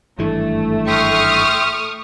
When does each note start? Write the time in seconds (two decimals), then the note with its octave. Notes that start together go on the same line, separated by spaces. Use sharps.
0.19 G#1 G2 E3 A3
0.87 E5 G5 C6 C#6 D#6 F6